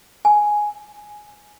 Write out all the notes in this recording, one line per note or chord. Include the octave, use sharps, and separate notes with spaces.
G#5